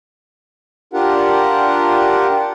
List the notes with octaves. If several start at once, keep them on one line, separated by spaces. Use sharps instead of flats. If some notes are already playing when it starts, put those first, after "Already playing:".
D4 F4 G4 A#4 F#5